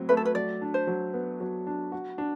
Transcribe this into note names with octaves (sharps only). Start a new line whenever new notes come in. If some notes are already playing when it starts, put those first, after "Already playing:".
Already playing: A2 F#3 C4
A3 B4
A4
B4
F#3 D5
D4
C5
F#3
B3
F#3
D4
F#4
D4